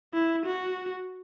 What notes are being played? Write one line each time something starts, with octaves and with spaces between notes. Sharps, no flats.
E4
F#4